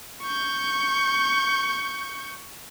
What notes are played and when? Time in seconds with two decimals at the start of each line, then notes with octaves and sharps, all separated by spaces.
0.22 C#6 G6